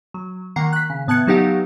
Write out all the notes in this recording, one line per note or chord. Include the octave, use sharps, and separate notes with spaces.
F#3
D#3 A#3 F#5 A#5 C7
F#6 B6
C#3
A2 B3 A5 F#6 G#6 C#7
F#3 B3 D#4 G4 F5 F#5